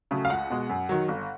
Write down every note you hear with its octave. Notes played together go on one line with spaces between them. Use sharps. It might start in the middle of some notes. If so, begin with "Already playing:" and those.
C#3 F#3 A3
F5
C#2 F#5
B2 G#3
F#2
D#3 F#3
G1